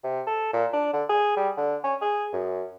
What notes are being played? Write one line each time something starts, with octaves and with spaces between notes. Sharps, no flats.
C3
A4
A#2
D4
D3
G#4
G3
D3
C#4
G#4
F#2